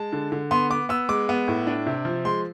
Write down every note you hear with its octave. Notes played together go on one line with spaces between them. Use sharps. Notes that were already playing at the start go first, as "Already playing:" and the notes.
Already playing: G#3 A5
D3
D3
B3 C6
B3 D6
B3 E6
G#3 D6
B3
A2
D4
C3
F3
G#3 C6